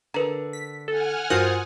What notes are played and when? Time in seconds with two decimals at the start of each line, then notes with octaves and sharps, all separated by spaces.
0.14 D3 A#4 B4 A#5
0.53 B6
0.88 A4 F#5 G#5 F6
1.30 G2 F4 F#4 A#4 C5 D#6 F#7